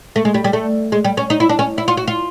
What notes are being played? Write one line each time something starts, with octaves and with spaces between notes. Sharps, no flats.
A3
G#3
G3
G3
A3
G#3
G3
C#4
D#4
E4
D4
C#4
E4
F4
F#4
F4